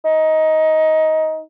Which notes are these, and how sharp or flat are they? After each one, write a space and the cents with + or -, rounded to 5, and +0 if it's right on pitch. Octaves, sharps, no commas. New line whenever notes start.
D#4 +15